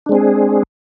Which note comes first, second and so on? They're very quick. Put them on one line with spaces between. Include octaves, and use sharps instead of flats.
D4 G#3 C4 G#4